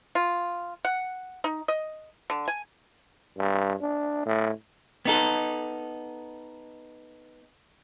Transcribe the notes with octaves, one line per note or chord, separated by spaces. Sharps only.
F4
F#5
D#4
D#5
D3
G#5
G2
D4
A2
B3 D#4 A4